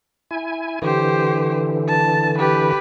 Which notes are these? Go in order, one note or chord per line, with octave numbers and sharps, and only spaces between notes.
E4 G#5
D3 E3 G4 C5
A5
G4 B4